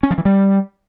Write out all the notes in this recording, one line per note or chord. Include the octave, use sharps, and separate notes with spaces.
C#4
F3
E3
G3